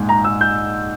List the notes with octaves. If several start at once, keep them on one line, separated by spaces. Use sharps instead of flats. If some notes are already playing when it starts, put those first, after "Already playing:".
Already playing: A#1 G#2 G#3
A#5
E6
G6